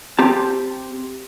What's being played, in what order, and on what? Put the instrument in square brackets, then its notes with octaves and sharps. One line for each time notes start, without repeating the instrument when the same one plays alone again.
[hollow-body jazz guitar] C4 G4 A5